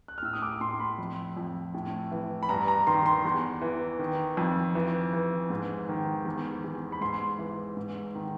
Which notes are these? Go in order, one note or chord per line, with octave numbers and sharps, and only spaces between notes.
F#6
F6
A2 E6
D#6
D6
A2 C6
B5
F2
F2
A2
E3
B5
G2 A#5
A#5
D#3 C6
C6
E2
E3
D#3
F2
E3
E3
G#2
D#3
E2
E2
B5
G#2 C6
E3
G#2
D#3